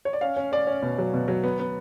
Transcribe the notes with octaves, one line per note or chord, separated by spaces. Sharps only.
C#5
D5
C#4 F5
C#4
C#4 D5
C#4
B2
F#3
B2
F#3
B3
B3